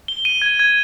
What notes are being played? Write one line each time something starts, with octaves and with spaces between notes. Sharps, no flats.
G7
D#7
G#6
G#6